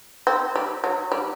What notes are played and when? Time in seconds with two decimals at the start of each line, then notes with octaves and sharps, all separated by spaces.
0.27 C4
0.56 G3
0.84 F#3
1.12 G3